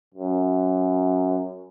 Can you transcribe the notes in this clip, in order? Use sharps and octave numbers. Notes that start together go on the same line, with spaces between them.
F#2